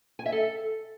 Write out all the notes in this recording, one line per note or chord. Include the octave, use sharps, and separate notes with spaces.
G#5
E5
A4